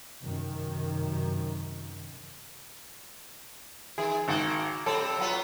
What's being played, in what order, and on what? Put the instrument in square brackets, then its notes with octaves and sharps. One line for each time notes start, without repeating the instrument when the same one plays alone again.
[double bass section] F#2 C3 D#3
[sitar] D#3 [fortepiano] G#4
[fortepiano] G#1 [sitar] A#3 F#4
[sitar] C3 G3 C4 [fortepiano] A4
[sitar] F#3 B3 F4